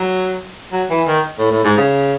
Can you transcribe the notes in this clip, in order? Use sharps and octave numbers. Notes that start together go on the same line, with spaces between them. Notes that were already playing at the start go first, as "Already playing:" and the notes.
Already playing: F#3
F#3
E3
D#3
A2
A2
G#2
C#3